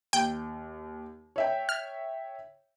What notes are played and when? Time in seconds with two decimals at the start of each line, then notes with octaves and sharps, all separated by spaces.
0.13 D#2 G5
1.36 C#5 E5 G5
1.69 F6